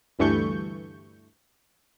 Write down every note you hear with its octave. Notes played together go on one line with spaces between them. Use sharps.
D2 G2 E3 A3 C#6 G6